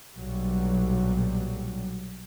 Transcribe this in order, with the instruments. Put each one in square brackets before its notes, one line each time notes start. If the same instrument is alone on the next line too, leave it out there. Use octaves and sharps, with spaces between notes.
[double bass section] B1 A#2 F#3 G3